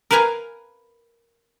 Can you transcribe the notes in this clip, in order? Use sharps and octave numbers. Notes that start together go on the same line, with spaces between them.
A#4 B4 F5 G#5 A#5